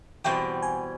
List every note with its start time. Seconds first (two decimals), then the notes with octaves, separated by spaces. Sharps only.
0.24 E2 B2 G3 C4 G5
0.63 G#5